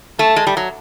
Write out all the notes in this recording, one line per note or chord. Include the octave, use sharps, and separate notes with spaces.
A3 A5
G#3
G3
F#3